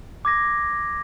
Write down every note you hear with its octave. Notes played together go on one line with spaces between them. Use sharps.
D6 G#6 A#6